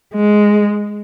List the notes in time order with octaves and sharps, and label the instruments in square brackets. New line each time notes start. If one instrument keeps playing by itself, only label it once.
[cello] G#3